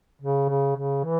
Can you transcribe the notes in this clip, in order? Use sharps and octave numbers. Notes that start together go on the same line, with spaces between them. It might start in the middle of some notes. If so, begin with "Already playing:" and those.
C#3
C#3
C#3
E3